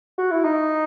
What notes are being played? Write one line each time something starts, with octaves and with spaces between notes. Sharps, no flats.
F#4
E4
D#4